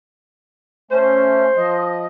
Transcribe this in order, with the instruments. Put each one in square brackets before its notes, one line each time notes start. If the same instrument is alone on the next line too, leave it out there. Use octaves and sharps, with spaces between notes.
[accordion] A3 C#4 [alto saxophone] C5
[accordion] F3 D#5